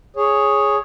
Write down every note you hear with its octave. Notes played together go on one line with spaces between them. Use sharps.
G#4 C#5